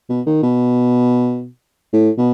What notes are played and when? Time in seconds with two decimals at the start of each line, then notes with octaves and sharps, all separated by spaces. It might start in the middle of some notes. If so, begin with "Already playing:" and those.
0.09 B2
0.26 D#3
0.43 B2
1.93 A2
2.18 B2